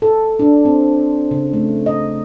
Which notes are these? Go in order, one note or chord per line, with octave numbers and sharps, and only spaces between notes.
A4
D4
C4
C#3
A3
D#5